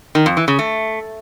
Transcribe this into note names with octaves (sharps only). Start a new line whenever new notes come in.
D#3
F2
E3
C#3
A3